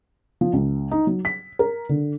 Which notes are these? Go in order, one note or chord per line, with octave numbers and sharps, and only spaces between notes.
F3
C#2
D#4
F#3
B6
A#4
D3